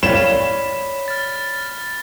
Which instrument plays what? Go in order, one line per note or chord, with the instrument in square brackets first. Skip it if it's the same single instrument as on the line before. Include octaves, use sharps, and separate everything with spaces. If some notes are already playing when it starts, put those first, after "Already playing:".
[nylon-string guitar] C#5 D5 F5 [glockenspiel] B5 B6 G7 [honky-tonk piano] E7
[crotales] F6 A6